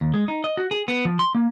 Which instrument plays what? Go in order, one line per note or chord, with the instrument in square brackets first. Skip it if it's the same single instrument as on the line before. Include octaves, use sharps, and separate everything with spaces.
[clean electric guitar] D#2
G#3
D#4
D#5
F#4
G#4
B3
F3
C6
A#3